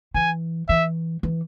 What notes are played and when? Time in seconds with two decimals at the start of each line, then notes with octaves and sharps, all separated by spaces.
0.14 E3 G#5
0.69 E3 E5
1.23 E3